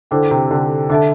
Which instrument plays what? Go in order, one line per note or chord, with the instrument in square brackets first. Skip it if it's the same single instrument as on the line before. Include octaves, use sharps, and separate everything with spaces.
[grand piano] D3 [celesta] E4 A4 C5 G5 D6
[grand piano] C3
D3
[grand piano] D3 [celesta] A4 E5 A5